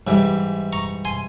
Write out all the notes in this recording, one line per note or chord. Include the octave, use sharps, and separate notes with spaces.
G#2 E3 G3
A#5 C#6
G#5 C6